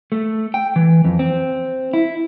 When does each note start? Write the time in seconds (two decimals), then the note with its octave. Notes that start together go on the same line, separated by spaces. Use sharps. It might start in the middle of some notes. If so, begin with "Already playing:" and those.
0.12 A3
0.54 G5
0.76 E3
1.05 F2
1.19 C4
1.94 E4